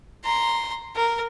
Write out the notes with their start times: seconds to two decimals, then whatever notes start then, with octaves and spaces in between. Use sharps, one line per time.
0.24 A#5 C6
0.96 A#4